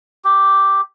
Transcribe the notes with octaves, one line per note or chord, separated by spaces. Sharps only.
G4